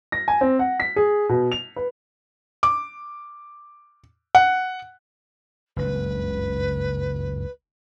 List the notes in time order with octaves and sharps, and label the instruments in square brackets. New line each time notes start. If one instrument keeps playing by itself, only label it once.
[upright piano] A#6
G#5
C4
F#5
B6
G#4
B2
F7
B4
[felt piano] D6
F#5
[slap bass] F#1 C#2 G2 [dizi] B4